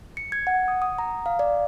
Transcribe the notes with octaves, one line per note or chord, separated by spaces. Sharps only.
C#7
G#6
F#5
D#6
D#6
A#5
F5
D5